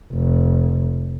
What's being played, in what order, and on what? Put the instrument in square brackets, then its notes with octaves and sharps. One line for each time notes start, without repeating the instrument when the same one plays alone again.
[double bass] F1